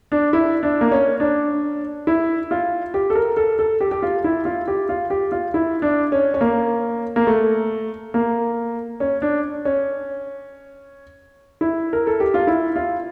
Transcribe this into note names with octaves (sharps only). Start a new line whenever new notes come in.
D4
E4
D4
A#3
C#4
D4
E4
F4
G4
A4
A#4
A4
A4
G4
G4
F4
E4
F4
G4
F4
G4
F4
E4
D4
C#4
C#4
A#3
A#3
A3
A#3
C#4
D4
C#4
E4
A#4
A4
G4
F4
E4
F4